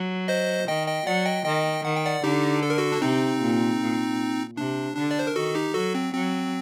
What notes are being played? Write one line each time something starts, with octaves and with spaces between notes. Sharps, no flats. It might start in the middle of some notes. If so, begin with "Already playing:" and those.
Already playing: F#3
C5 D#5
D#3 D#5 G5
D#5 G5
F#3 D5 F#5
D#5 G5
D#3 D#5 G5
D#3 F#5
G5
D5 F#5
D3 D#4 G4
A4
A#4
F#4 A4
D4
C3 C4 D#4
A#2
A#2
C3 D4
D3 D4
D5
C5
A#4
D#3 F#4 A4
D#4 G4
F#3 F#4 A4
C4
F#3 C4